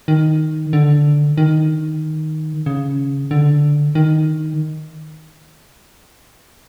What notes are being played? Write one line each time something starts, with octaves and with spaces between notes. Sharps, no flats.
D#3
D3
D#3
C#3
D3
D#3